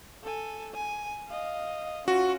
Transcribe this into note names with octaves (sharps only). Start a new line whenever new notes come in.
A4 G#5
G#5
D#5 F5
C#4 F4 F#4